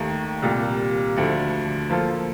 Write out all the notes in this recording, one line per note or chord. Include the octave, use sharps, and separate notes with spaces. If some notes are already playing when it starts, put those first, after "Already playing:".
Already playing: D#2 D#3 A3
C2 A#2 G3
D2 D3 F3 A3
F3 A#3 F4 A4